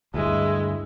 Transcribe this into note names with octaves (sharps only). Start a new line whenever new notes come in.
D2 G2 G#3 E4